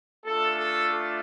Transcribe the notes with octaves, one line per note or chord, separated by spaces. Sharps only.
A3 D4 F4 A4
A4